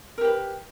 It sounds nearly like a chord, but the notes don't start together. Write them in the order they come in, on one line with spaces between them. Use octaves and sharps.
A#4 G4 B4